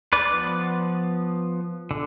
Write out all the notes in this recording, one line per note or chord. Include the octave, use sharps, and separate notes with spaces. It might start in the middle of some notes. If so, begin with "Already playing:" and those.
B4 D5
F3 B3
D3